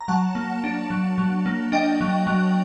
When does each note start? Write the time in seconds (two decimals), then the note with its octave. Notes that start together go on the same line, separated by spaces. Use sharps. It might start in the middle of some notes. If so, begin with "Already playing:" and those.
0.01 A#5
0.08 F#3 F#5 A5
0.35 A#3
0.64 D4
0.90 F#3
1.18 F#3
1.46 A#3
1.72 D4 D#5 G5
2.01 F#3
2.27 F#3